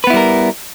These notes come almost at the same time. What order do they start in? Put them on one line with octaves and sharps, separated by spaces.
B4 B3 E4 G3 A#4